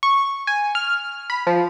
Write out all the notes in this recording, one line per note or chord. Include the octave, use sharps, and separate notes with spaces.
C#6
G#5
F6
B5
F3